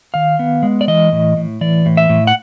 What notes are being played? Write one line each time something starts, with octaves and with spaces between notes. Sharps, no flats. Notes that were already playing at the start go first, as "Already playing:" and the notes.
D#3 F5
B3
G#3
D5
E3 D#5
A2
A2
E3 D5
A2
E5
A2
F#5